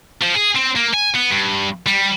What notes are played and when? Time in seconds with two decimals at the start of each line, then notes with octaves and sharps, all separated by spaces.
0.21 F3
0.34 G#4
0.55 C4
0.76 A#3
0.93 G#5
1.15 B3
1.31 G2
1.86 G3